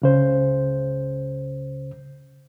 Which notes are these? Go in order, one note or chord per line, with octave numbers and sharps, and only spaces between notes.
C#2 C#3 C5